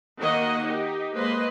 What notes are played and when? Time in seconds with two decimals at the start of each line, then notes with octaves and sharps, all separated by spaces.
0.19 D#3 A#3 F#4 D#5 F#5
0.62 D#4 G4
1.15 G#3 A#3 B4 C5 D#5 C6